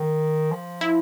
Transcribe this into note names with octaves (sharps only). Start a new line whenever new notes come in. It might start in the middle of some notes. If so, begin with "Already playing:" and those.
Already playing: D#3
F3
E4